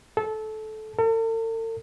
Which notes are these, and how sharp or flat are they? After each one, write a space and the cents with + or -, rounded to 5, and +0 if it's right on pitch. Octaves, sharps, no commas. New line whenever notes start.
A4 -20
A4 +45